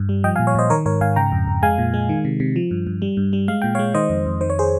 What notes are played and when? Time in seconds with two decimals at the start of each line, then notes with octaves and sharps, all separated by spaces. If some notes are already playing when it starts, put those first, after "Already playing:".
Already playing: G2
0.09 G3
0.24 F3 D#5 G5
0.36 F5 G#5
0.39 A#2
0.47 C#5 F5
0.55 A#2 C5 D#5
0.70 D#3 A#4 C#5
0.85 G#2 A#4 C#5
1.01 G#2 F5 G#5
1.16 C#3 G5 A#5
1.32 F2
1.47 F2
1.63 G#3 F5 G#5
1.78 A#2
1.94 G#3
2.09 D#3
2.25 C3
2.40 C3
2.56 F3
2.71 G2
2.87 G2
3.02 G3
3.17 G2
3.33 G3
3.48 G#3 F5
3.62 A#2 G5
3.75 C#5 F5
3.79 G#3
3.94 D#3 C5 D#5
4.10 F2
4.26 F2
4.41 D#3 C5
4.50 C#5
4.59 G#4 C5